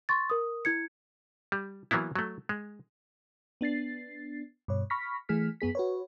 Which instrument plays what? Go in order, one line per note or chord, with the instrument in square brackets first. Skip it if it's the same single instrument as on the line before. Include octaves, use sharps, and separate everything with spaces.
[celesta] C6 C#6 A6
A#4 D#6
E4 G#6 C#7
[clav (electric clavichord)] G3
E3 F#3 A#3 B3 E4
F#3 A3
G#3
[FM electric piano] B3 D4 A6 C7
G2 B2 C#5
B5 C#6 F6 A#6 B6
E3 A3 G#4 F6 B6
F#2 B3 G#4 B6
F#4 B4 C#5